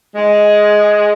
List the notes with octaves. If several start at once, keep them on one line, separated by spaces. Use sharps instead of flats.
G#3